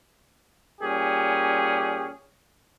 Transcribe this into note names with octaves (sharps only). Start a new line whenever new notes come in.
A#2 G3 C#4 G4 G#4